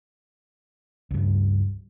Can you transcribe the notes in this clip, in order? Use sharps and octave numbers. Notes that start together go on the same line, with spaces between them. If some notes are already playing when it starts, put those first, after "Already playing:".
C#2 G2